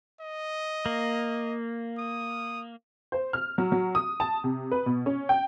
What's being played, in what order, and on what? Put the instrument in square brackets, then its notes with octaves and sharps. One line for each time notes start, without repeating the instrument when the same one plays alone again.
[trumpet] D#5
[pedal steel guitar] A#3
[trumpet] D#6
[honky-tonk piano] C5
F6
F#3
F#3
D#6
A5
C3
B4
B2
C#4
G5